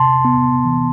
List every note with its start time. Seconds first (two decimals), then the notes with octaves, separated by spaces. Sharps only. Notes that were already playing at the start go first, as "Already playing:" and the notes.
Already playing: C3 A5 C6
0.25 B3
0.65 E3